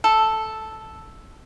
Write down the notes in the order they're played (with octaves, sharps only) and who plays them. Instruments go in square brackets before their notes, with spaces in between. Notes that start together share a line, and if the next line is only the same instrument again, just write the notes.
[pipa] A4